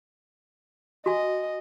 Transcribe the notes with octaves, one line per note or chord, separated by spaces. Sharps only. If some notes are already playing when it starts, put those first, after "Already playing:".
F#4 D#5 G#5